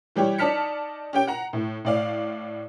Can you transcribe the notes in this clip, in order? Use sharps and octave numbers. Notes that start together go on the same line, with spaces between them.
E3 G3 G4 C#5
D#4 D5 A5 F6 B6 C#7
C#4 G4 G5
F#5 A#5
A2
A2 D5 F5